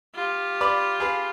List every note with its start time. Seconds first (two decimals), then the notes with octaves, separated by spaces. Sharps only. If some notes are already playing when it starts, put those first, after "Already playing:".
0.15 F4 G4
0.61 B4 D5 D6
1.00 G#4 B4 F5